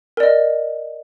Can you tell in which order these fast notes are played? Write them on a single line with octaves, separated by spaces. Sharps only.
A#4 D5 D#5